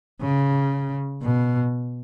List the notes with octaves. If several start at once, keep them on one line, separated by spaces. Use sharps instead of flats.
C#3
B2